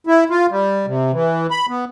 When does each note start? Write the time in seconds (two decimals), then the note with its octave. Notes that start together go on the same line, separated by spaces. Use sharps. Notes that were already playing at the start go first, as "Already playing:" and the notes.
0.07 E4
0.30 F4
0.51 G3
0.86 C3
1.12 E3
1.51 B5
1.69 B3